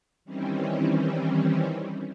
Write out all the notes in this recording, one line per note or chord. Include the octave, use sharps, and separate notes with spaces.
D#3 E3 G3 C4 C#4